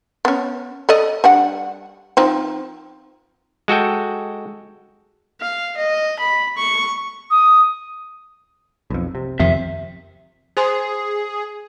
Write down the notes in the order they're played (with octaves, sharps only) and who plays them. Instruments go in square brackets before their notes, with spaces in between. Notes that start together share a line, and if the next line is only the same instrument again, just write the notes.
[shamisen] B3 C#4
A4 D5 D#5
G3 D4 F#5
F3 C4 D#4
[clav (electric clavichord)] G#3 F#4 A4 G5
[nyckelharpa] F5
D#5
B5
C#6
[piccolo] D#6
[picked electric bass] B1 F2
C3
[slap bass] F2 D#3 [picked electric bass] C3 [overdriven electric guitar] E5
[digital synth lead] G#4 [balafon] C5 G#5 C6